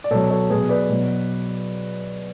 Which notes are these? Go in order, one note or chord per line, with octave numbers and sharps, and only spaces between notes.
D5
B2 F#3 A4 C#5
A4 C#5
B2 F#3 G#4 B4
B4 D5
B2 F#3